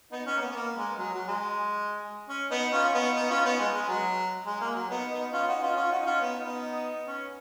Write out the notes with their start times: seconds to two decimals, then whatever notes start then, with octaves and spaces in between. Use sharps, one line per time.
0.12 B3 D#4
0.26 C#4
0.37 A#3
0.41 B3
0.51 B3
0.55 A#3
0.77 G#3
0.99 F#3
1.14 F#3
1.28 G#3
2.29 C#4
2.51 B3 D#4
2.73 C#4 F4
2.89 C#4
2.94 B3 D#4
3.16 B3 D#4
3.30 C#4 F4
3.45 B3 D#4
3.59 G#3
3.75 G#3
3.89 F#3
4.47 G#3
4.61 A#3
4.76 F#3
4.90 B3 D#4
5.11 B3 D#4
5.33 C#4 F4
5.48 D#4 F#4
5.62 C#4 F4
5.77 C#4 F4
5.91 D#4 F#4
6.02 D#4
6.06 C#4 F4
6.20 B3 D#4
6.42 B3 D#4
7.08 C#4